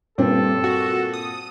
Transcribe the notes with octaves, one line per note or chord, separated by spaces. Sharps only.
G2 A#2 C4 A4
F#4
D#6